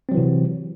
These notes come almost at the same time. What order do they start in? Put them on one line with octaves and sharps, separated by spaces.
C4 F#3 E3 C3